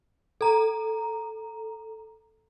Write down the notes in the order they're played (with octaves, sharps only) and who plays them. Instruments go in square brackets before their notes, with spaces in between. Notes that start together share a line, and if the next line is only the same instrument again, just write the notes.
[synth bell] A4 A#5